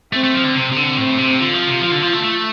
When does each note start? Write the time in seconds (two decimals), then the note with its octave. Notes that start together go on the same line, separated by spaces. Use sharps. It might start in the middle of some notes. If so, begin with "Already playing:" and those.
0.13 A3 C4
0.24 A3
0.34 F3
0.45 D3
0.55 C3 C4
0.72 C3
0.76 D3
0.97 A2 C4
1.18 C3
1.39 D3 F4
1.54 F3
1.67 C3
1.81 F3
1.92 D3
2.02 F3
2.13 A3
2.24 A3